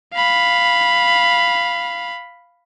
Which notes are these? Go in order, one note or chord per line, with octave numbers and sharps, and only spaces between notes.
F5 B5